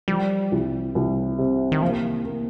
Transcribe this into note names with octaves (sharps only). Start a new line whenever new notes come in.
F3 G3
C2
C2
C3
D#3
F3 A#3
A#3